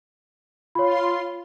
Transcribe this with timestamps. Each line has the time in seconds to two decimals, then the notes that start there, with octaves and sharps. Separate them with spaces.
0.75 F4 C#5 B5 C6